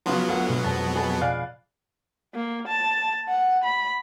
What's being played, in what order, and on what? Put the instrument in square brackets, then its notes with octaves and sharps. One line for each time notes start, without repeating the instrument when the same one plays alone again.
[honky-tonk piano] C#3 F3 [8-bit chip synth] F#3 B3 [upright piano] F4 F#4 C6
[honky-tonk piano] D2 [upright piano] F4 A#4 F#5
[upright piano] B1 [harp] B2 G#3
[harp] F2 B2 D#5 [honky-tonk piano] A4
[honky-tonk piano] G#4 A4 [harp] B5
[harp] B2 D5 [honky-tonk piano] F5 G#5 F#6
[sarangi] A#3
A5
F#5
B5